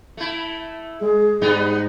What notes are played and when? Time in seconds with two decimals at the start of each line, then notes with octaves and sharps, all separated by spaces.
0.17 A3 E4
1.01 G#3 G#4
1.41 G#2 G3 B3 D#4